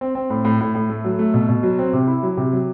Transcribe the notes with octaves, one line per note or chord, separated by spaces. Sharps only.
C4
C4
A2
A2
A2
A2
A3
F#3
A3
B2
B2
F#3
C4
C3
E4
F#3
C3
F#3